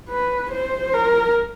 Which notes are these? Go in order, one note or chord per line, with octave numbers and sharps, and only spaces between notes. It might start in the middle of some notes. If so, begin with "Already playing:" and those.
B4
C5
A#4